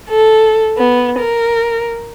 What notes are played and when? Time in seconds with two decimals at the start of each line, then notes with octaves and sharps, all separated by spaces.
0.10 A4
0.77 B3
1.19 A#4